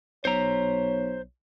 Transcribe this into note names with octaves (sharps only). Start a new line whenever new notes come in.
B1 C5 C#5 A#5